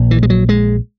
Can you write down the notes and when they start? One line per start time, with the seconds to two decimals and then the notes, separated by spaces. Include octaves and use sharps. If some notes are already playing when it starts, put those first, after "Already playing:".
Already playing: A#1 A#2
0.11 E3
0.23 G#3
0.30 F#3
0.49 G#3